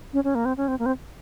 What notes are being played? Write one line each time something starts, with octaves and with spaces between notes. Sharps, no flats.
C#4
C#4
A#3
C4
C#4
C4
A#3
C4